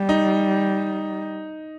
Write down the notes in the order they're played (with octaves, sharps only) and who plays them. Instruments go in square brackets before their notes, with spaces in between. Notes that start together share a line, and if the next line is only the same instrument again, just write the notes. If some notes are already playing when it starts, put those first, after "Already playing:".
Already playing: [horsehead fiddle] G3
[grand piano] D#4